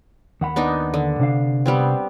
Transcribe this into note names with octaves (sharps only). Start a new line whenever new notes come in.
D#2 F#5 B5
B3 D4 D#4
D3
C3 D4 F5
G3 B3 C4